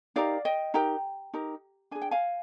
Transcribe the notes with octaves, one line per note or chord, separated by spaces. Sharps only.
D#4 G4 A#4 D5 F5
D#5 G5
D#4 G4 A#4 G5 A#5
D#4 G4 A#4
D4 G#4 G#5
G5
F5 G#5